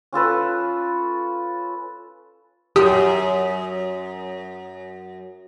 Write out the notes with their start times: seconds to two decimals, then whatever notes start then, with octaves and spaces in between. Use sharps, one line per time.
0.13 C#4 F4 A4 B4
2.76 F#2 G4 D#6